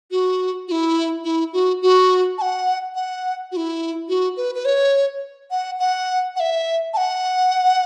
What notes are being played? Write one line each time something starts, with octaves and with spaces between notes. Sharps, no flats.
F#4
F#4
E4
E4
F#4
F#4
A5
F#5
F#5
F#4
E4
F#4
B4
B4
C#5
F#5
F#5
F#5
E5
A5
F#5